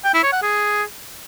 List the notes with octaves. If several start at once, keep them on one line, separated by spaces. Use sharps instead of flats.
G5
E4
C#5
F#5
G#4